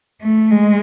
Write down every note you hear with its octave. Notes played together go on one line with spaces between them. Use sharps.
A3
G#3